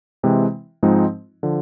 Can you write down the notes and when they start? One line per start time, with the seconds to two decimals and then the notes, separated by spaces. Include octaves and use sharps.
0.23 C3 E3 G#3 C4
0.83 G#2 F3 G#3 C4 D#4
1.43 D3 F3